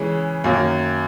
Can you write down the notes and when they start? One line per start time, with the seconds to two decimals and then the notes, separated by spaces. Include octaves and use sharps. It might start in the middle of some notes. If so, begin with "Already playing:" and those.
Already playing: C#3 E3 G#3 C#4
0.44 F#2 D#3 F#3 A#3